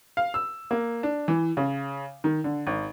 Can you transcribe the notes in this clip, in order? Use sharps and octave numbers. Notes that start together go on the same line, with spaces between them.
F5
E6
A#3
D4
E3
C#3
D#3
D3
G#1